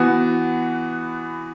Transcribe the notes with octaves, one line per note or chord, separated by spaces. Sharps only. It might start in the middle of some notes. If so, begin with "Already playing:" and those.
Already playing: E3 B3 F#4